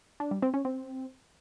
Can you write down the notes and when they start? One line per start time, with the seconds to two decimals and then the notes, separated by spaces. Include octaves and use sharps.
0.20 D4
0.31 G3
0.42 C4
0.54 C#4
0.65 C4